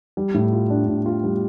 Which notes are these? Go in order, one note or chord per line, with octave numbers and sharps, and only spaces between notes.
G3
A2
F4
D4
A2
F4
G3